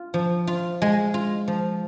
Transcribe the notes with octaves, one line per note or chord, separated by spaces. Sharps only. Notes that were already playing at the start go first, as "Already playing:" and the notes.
Already playing: F4
F3
F4
G#3
F4
F3